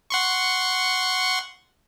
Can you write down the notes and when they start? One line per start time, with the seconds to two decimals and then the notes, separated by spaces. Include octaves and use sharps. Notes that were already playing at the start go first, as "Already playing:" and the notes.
0.10 F#5 C6 C#6